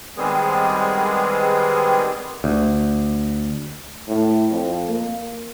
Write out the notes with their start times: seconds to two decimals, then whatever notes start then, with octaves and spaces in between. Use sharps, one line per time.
0.17 D#3 G3 G#3 B3 C4 G#4
2.44 D2
4.08 A2
4.51 F2
4.88 A#3